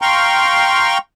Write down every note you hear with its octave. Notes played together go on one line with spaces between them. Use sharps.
F5 G5 A#5 C6 C#6